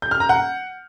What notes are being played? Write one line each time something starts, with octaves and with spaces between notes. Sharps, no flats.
G6
F6
A#5
F#5